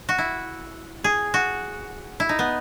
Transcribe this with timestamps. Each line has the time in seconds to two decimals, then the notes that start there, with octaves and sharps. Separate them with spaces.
0.09 F#4
0.18 E4
1.04 G#4
1.34 F#4
2.20 E4
2.29 D#4
2.39 B3